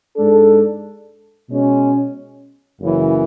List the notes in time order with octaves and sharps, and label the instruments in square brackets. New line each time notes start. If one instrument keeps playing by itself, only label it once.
[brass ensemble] G#2 G#3 D4 A4
B2 G#3 C#4
F#1 F#2 C#3 E3